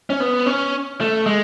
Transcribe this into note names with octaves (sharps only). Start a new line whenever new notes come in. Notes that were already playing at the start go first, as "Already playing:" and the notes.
C#4
B3
C#4
A3
G#3